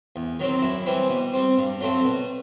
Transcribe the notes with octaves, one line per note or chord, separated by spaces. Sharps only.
E2
D#3 F#3 C4
F#2 E4
E3 G3 C4
B2
G3 C4
G2
F#3 A3 C4
B2